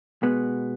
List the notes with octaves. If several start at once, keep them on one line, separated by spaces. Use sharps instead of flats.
B2 G#3 B3